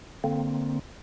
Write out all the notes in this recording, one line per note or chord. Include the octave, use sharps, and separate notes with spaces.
D3 A#3 C4